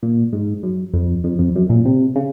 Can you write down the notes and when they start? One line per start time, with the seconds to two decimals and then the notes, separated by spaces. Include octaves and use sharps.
0.03 A#2
0.32 G#2
0.63 F#2
0.94 F2
1.24 F2
1.39 F2
1.55 F#2
1.69 A#2
1.85 C3
2.16 C#3